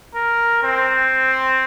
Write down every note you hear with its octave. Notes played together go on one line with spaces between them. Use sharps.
A#4
C4